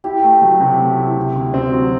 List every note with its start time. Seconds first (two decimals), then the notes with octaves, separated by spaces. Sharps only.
0.04 E4 G4
0.23 A3
0.42 F#3
0.61 C3
0.79 A3
0.98 E4
1.17 C3
1.35 D2
1.54 C4
1.73 F#3